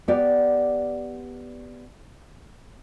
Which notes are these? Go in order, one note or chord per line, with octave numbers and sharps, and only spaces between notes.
B3 G4 D5